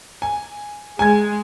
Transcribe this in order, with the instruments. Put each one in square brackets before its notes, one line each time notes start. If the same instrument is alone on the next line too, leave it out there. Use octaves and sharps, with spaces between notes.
[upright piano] G#5
[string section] G#3 [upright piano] G#5 G#6